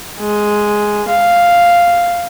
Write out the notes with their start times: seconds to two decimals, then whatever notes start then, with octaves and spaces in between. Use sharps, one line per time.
0.20 G#3
1.08 F5